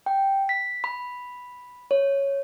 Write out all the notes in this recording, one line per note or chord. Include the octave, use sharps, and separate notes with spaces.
G5
B6
B5
C#5